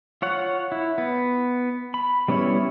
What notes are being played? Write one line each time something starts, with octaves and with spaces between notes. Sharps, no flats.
F4 C#5 F#5
E4
B3
B5
G3 B3 C#4 E4 C#5